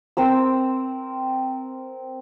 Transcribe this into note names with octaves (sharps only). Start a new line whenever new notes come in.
C4 A#4 E6